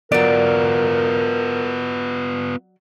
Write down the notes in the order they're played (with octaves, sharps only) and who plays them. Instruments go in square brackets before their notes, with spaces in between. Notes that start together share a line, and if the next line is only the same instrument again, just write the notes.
[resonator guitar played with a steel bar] F#3 D5 [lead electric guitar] B3 F4 [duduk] A#4